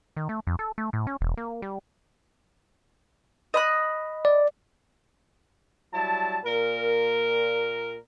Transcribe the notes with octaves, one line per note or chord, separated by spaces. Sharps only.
D#3
A3
F2
A4
A3
A2
C#4
E1
A#3
G3
D#5 B5 F#6
D5
F#3 G3 E4 A5
A#2 A#4